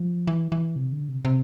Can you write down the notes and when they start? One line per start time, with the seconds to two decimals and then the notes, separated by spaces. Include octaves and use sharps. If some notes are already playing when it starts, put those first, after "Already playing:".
Already playing: F3
0.27 E3
0.52 E3
0.76 C3
0.92 D3
1.09 C3
1.25 C3